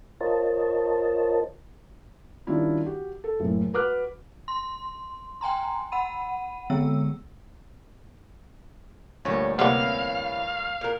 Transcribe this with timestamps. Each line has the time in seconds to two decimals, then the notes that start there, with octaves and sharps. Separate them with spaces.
0.21 F4 A#4 C5 C#5 D#5 A5
2.47 D#3 G3 C#4 D4 E4 F4
2.85 F#4 G4
3.24 A4
3.40 F#1 A2
3.73 F#4 B4 D6 F6 F#6
4.48 C6
5.41 G5 G#5 A#5 C6
5.92 F#5 B5 D#7
6.70 D3 G#3 B3 E6
9.25 D2 A#2 G3 G4 C#5
9.59 C3 A#3 B3 C#4 E4 F5
10.81 A#2 A#4